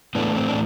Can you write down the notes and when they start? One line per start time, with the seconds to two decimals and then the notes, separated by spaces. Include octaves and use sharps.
0.15 A2 E3 A3 B3 D4
0.36 C4
0.48 D4